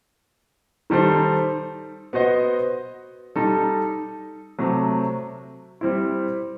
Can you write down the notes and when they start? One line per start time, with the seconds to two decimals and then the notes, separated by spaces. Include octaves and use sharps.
0.90 D#3 G3 D#4 A4 C5
2.13 B3 F#4 C5 D#5
3.36 G3 D#4 A4
4.59 C3 F#3 A3
5.81 G3 C4 E4